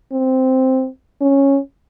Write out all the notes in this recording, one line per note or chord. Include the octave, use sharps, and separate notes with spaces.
C4
C#4